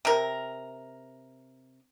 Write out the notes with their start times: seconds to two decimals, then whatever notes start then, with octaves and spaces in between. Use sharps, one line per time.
0.05 C3 A#4